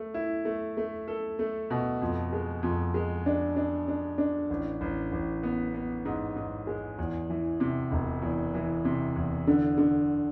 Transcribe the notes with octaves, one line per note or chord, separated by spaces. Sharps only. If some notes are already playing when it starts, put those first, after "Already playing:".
Already playing: A3
E4
A3
A3
A4
A3
B2
F2
G#3
F2
G#3
D4
D4
D4
D4
A1
A1
A1
B3
B3
G#2
G#2
G#3
E2
E3
C3
E1
E2
E3
C3
E2
D3
D3